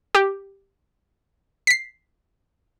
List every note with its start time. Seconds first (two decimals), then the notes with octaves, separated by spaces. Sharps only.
0.15 G4
1.67 B6 C7